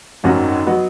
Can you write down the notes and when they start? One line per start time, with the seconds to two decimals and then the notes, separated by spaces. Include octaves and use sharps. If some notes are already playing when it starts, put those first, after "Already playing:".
0.24 G#1 F#2 D#3 F#3 C#4 F#4
0.66 F#3 B3 D#4 F#4